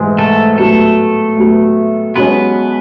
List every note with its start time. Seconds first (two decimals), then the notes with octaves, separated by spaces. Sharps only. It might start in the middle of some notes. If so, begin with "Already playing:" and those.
Already playing: G#2 E3 G#3
0.18 A3 A4
0.58 A2 F#3 A3 B3 A4
1.37 A2 F#3 B3
2.16 B1 B2 G#3 B3 C#4 B4